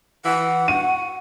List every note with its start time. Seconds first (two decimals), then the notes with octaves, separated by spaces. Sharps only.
0.25 E3 F#5
0.68 F#4 D#7